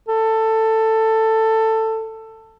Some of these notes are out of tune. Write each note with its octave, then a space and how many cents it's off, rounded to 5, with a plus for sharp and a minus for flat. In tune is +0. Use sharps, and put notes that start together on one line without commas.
A4 +15